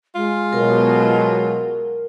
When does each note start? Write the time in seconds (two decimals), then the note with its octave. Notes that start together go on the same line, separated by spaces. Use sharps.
0.15 G#3 F4
0.53 B2 F#3 A#4